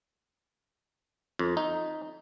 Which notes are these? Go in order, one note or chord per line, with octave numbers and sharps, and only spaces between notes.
F2
D#4